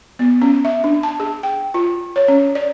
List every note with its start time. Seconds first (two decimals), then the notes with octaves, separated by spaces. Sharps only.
0.19 B3
0.42 C#4
0.65 E5
0.84 D4
1.03 A5
1.20 G#4
1.43 G5
1.74 F4
2.16 C#5
2.28 C#4
2.55 D5